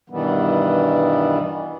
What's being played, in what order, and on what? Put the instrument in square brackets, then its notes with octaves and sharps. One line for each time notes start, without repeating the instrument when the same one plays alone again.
[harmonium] G2 B2 D#3 E3 G3 B3